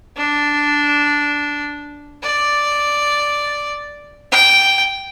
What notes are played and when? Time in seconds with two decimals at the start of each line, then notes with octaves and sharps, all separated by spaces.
0.17 D4
2.24 D5
4.31 G5